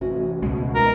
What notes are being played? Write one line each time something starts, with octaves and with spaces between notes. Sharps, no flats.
A1 C3 C#4 F#4
C#2 B2 G#3
C3 D#4 A#4